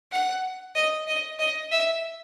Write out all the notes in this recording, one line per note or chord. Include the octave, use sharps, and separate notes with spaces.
F#5
D#5
D#5
D#5
E5